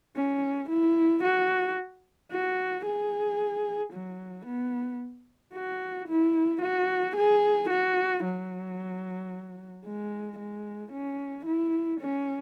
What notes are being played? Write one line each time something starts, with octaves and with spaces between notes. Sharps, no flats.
C#4
E4
F#4
F#4
G#4
F#3
B3
F#4
E4
F#4
G#4
F#4
F#3
G#3
G#3
C#4
E4
C#4